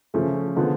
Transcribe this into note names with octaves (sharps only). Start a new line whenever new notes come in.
C#3 F3 A3 C#4
D3 F3 G#3 B3